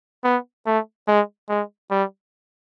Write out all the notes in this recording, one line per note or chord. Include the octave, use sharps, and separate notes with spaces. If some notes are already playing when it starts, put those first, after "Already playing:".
B3
A3
G#3
G#3
G3